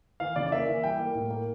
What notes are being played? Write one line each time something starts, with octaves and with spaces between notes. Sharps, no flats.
E3 F5
C#3 D5
D5
A#3 E5
E3
G3 G5
A#3
A2
A#3